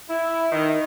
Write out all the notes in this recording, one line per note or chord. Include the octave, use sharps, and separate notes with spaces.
E4
D#3